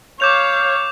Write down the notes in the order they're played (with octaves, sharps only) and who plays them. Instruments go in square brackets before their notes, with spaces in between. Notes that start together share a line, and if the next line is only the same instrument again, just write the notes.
[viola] C#5 F5 [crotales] D6 G6 F7